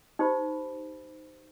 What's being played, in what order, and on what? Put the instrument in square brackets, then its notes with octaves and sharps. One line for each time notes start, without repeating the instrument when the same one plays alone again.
[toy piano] D#4 G4 C5 B5